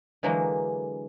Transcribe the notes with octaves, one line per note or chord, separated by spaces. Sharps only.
D3 E3 F#3 G#3 A#3